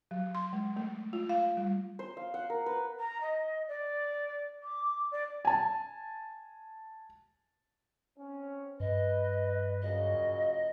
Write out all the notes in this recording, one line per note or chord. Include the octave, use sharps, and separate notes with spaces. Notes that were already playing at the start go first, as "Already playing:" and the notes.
F#3
C6
G#3
A3
F4
F5
G3
C5
F5
F#5
A#4
B4
A#5
D#5
D5
D6
D5
G#5 A5
C4 C#4
G2 B4 D#5
A#2 C#3 F#3 D#5